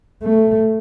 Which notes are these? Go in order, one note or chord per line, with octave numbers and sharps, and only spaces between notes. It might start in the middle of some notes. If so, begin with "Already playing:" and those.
A3